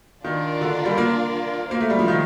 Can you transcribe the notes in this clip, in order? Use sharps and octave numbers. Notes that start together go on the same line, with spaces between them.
D#3 D4 F4 A#4 D5
D3
G3
A#3
A#3 F4 C5 F5
A3
G3
F3
D#3